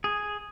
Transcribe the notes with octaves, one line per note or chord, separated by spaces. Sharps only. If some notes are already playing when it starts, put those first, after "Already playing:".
G#4